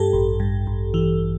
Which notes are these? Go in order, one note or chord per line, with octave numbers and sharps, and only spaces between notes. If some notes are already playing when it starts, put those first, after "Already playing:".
Already playing: G2 G4 A4
A1
G2
A1
E3